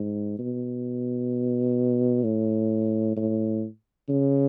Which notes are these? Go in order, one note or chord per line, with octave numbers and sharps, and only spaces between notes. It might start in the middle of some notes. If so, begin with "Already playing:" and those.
Already playing: G#2
B2
A2
A2
C#3